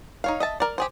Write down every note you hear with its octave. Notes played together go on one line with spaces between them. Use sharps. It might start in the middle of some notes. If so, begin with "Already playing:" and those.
D#4 C#5 F5
D#5 E5 A5
A#4 D5
G4 G#4 C5